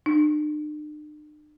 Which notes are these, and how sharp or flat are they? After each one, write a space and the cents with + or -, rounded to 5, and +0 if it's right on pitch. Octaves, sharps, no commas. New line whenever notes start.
D4 +45